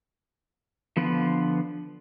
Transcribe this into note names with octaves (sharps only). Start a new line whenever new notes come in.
D3 F3 B3 F4 B4